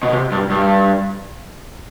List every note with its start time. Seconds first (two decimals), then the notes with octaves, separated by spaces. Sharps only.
0.03 B2
0.12 C3
0.32 G2
0.50 G2